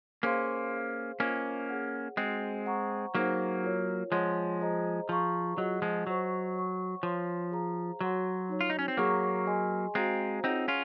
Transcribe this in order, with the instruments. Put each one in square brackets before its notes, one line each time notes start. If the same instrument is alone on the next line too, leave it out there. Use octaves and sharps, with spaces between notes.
[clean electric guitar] A#3 C#4 [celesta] G#4 C5 F5 C6
[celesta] G#4 C5 F5
[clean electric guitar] A#3 C#4 [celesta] F4 C5 D#5
[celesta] G#4 C#5 F#5
[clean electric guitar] G#3 C4 [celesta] F#4 C5 F#5
[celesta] C5 F#5 A#5 C#6
[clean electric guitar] F#3 A#3 [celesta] D#4 G#4 C5 F#5
[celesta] F4 A#4 C#5
[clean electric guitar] F3 G#3 [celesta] C#5 F#5 C6
[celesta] G#4 C5 D#5 A#5
[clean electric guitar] F3 [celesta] G#4 C5 F5 A#5 C#6
[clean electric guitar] F#3 [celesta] F4 G#4 D#5 F#5
[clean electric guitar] F3 G#3
[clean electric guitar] F#3 [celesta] C5 D#5 F#5 C#6
[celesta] C#5 F#5 C#6
[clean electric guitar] F3 [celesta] C#5 F5 C6
[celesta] G#4 C5 F5 A#5
[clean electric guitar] F#3 [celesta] F#4 C#5 F#5 C6
[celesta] D#4 F#4 C#5
[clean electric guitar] F4
D#4
C#4
C4
[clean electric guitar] F#3 A#3 [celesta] G#4 C#5 F#5 A#5 C#6
[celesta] G#4 D#5 G#5 C6
[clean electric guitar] G#3 C4 [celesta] F#4 C5 F5 A#5
[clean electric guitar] C4 D#4 [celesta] F4 G#4 C#5 F#5
[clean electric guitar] C#4 F4